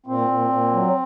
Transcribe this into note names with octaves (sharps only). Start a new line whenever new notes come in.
A#2 C4
A#2
A#2
F#3